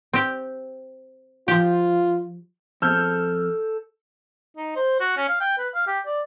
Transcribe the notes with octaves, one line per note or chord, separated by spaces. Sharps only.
C4 G4
F3 F4 G4
F2 A4 E6 F6 G6
D#4
C5
F#4
C#4
F5
G5
B4
F5
G4
D5